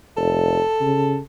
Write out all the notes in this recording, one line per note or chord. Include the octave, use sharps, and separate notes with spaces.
F1 A4
C#3